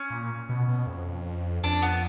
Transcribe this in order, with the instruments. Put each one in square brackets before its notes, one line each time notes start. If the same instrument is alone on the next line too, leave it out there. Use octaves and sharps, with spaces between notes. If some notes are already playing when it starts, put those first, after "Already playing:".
Already playing: [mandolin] C#4
[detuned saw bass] A#2
B2
B2
F2
[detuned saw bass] F2 [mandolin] D4
[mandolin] B3